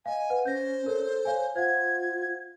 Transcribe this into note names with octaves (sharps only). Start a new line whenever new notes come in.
D#5 F5 G#5
B4 F#5
C#4 C5 G6 A#6
A4 A#4 C#5
C#5 F5 G#5
F4 C5 F5 F#5 G#6